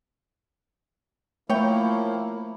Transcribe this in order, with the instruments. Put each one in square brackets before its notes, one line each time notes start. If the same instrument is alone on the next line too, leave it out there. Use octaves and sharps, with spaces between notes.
[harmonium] F3 A#3 E4 [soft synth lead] A3 [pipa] C#5 G5